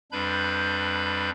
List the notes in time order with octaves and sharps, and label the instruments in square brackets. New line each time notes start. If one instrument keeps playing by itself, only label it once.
[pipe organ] F2 G3 D4 B4 B5 G6